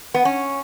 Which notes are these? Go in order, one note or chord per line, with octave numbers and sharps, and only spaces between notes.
B3
C#4